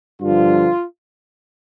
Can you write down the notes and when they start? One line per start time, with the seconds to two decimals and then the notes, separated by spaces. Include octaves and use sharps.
0.21 G2 D3 F3 F4